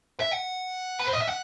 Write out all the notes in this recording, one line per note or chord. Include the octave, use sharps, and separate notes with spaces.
E5
F#5
B4
C5
D#5
E5
F#5